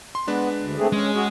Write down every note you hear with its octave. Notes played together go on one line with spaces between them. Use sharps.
C6
G#3 B3 D4 B4
D2
A3 C4 G#4
G#3 C#4
C#4 F#4 G#4